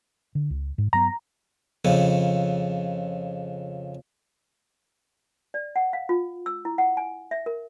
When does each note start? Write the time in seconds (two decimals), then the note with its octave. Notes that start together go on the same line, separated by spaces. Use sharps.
0.35 D3
0.50 C#2
0.78 G#2
0.93 G2 F#3 B3 A#5
1.85 F2 C#3
5.54 D5
5.76 F#5
5.93 F5
6.09 F4
6.46 E6
6.65 E4
6.78 F#5
6.97 G#5
7.31 E5
7.46 A#4